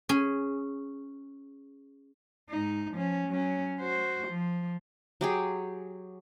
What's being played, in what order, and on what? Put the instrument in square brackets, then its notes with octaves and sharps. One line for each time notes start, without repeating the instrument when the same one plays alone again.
[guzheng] C#4 G#4
[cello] G#2 D#4
F3 C#4
F#3 C#4
F#4 C5
F3
[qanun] F#3 G4 G#4